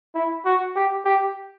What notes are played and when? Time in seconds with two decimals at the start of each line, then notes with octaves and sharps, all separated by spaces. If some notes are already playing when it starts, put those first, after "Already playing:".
0.15 E4
0.45 F#4
0.76 G4
1.05 G4